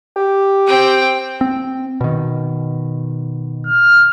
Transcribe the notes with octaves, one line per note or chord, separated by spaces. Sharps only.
G4
C4 G5
C4
B2 D#3
F6